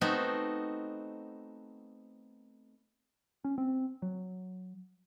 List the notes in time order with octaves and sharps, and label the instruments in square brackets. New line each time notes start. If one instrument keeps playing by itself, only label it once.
[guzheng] A3 B3 C4 D#4 F#4
[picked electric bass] C#4
C4
F#3